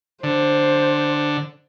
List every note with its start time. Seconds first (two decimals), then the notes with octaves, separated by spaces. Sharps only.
0.23 D3 C5